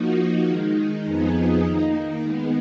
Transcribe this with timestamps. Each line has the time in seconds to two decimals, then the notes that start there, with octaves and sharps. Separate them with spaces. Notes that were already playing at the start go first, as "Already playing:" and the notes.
Already playing: F3 A#3 D#4 F#4
0.47 D#3 G#3 D#4
1.05 F2 F3 B3 D#4 G#4
1.63 D#3 A#3 D#4
2.21 D#3 G#3 B3